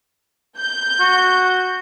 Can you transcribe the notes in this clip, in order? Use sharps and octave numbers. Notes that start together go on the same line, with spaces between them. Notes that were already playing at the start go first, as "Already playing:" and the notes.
G6
F#4